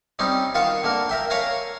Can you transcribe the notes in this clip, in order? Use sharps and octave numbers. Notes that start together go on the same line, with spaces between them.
G3 C4 C#4 D#4
D#3 F4 F#4 F5 C#6
D3 A#3 A#4
A#4 E5 G5
A#4 C#5 F5 G#5 A#5